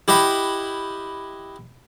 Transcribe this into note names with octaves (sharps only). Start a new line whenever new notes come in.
E4 G4 D#5 F#5 B5